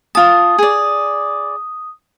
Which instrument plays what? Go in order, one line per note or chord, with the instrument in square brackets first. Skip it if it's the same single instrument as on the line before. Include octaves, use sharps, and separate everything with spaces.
[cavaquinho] F4 A5 [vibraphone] D#6
[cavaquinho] G#4 D5